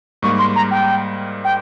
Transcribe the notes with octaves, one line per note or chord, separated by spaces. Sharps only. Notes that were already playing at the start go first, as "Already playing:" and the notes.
G#2 G3 A#3 C#6
C6
A#5
G5
G5